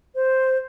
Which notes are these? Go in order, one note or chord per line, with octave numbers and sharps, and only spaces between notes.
C5